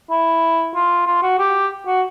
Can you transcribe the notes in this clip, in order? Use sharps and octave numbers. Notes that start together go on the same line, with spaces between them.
E4
F4
F4
F#4
G4
F#4